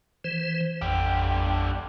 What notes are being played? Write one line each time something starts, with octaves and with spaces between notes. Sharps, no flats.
E3 C5
A1 F2 D3 G4